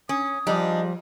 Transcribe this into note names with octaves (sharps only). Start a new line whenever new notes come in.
C#4 D#6
F3 G3 D4 D#4 G#4